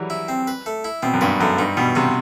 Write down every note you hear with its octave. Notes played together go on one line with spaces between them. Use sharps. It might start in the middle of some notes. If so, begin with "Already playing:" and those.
Already playing: E3 F#3 G3
E4
C4
B4
A3
E4
B2 C4
F#2
G2 B4
F#2 A3
G2 D#4
B2 G3
C3 F#4